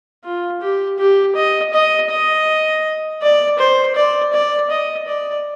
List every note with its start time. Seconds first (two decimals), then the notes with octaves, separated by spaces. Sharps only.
0.24 F4
0.61 G4
0.98 G4
1.35 D#5
1.73 D#5
2.10 D#5
3.22 D5
3.58 C5
3.96 D5
4.33 D5
4.70 D#5
5.07 D5